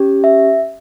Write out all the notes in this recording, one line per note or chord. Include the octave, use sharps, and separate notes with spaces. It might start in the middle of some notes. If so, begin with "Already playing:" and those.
Already playing: C#4 G4
E5